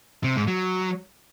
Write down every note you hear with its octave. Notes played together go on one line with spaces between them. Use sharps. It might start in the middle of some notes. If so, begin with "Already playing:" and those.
C3
G#2
F#3